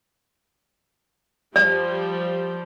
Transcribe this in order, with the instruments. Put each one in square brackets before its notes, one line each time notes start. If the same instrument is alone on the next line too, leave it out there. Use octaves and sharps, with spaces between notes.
[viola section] F3 G3 [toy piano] D5